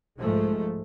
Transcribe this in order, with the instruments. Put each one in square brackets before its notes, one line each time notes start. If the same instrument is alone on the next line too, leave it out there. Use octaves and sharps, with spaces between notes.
[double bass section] B1 G#2 F3 G#3 A3